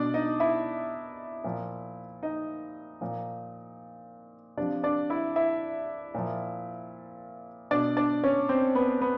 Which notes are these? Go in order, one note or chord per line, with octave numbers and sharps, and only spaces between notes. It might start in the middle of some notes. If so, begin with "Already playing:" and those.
Already playing: B2 D4 D5
D#4 D#5
E4 E5
A#2 F3
D#4 D#5
A#2 F3
C3 F3 D4 D5
D4 D5
E4 E5
E4 E5
A#2 F3
B2 D4 D5
D4 D5
C#4 C#5
C4 C5
B3 B4
B3 B4